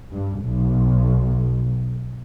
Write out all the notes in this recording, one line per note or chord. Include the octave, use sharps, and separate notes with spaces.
G2
B1